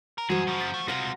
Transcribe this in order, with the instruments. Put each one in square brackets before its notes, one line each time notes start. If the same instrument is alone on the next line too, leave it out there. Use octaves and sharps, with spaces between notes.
[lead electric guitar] A#4
[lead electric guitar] F#2 [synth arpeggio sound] E3 F#3 G3 [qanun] F#4 C5 [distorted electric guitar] G#4
[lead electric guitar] F#2 C#3 [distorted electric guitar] F3
[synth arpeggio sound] A6 B6
[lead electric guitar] A3
[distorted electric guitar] C3 G3 [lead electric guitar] G#3 F5 [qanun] F#5 A#5